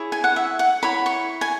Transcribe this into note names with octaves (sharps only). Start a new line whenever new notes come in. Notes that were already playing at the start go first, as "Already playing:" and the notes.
Already playing: E4 G#4 C#5
G#5
F#5
E5
F#5
E4 C#5 B5
C#6
G#5